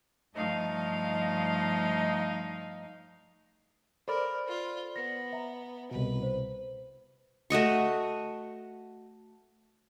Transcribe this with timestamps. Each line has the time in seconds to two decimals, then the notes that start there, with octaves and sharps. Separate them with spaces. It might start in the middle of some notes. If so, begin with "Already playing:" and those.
0.35 G2 F3 A3 D#4 D#5 F5
4.08 A4 A#4 C5 D5 B5 F6
4.48 F4
4.96 B3 A#6
5.33 E5 A#5
5.91 C2 B2 B4
6.23 C5
7.50 A3 F#4 D#5 C#6